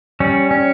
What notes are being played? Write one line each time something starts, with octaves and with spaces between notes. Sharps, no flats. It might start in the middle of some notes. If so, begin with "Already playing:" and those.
G3 C#4
C#4